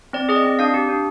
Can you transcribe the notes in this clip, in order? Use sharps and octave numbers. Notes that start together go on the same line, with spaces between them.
C4 D5
G#4 D5
D#5
C4
D4 F5
G4
D4